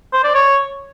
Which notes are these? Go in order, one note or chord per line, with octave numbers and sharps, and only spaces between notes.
C5
D5
C#5